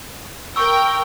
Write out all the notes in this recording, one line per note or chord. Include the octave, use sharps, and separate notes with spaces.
A#4 G5 C#6 E6